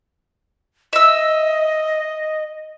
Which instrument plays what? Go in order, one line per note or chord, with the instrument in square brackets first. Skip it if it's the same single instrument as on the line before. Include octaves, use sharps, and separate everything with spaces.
[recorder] D#5 [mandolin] E5 E6